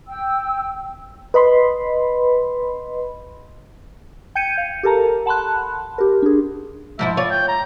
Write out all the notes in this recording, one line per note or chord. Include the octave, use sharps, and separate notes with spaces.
G5 E6
B4 D#5 B5 C6
G5 G6 G#6 C#7 D#7
F5
G4 A4 A#4 A5 A#5
F#5 A5 B5 C6 F#6
G4 A#4
D4 G#4
G#2 F3 E4 E5
F4 C#5 D5
G5
A#5